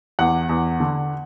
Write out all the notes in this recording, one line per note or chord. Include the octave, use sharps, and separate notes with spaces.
E2 F#5
E2
D3